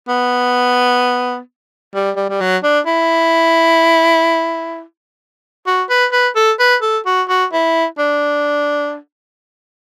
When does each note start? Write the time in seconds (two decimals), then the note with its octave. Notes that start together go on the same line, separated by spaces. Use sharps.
0.08 B3
1.94 G3
2.16 G3
2.29 G3
2.41 F#3
2.63 D4
2.86 E4
5.67 F#4
5.89 B4
6.12 B4
6.36 A4
6.59 B4
6.82 A4
7.06 F#4
7.29 F#4
7.53 E4
7.98 D4